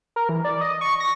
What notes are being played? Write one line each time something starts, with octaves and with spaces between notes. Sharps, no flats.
A#4
E3
D5
D#5
C#6
A#6